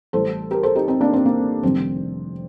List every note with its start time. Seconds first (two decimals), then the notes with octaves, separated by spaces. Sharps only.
0.13 A1 A2 G3 A4 C5
0.51 G4 A#4
0.63 A4 C5
0.75 D#4 G4
0.88 C4 D#4
1.01 A#3 D4
1.13 C4
1.25 A#3
1.63 F1 F2 D#3 G3 C4